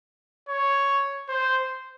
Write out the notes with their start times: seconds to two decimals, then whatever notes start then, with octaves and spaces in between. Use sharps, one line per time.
0.49 C#5
1.29 C5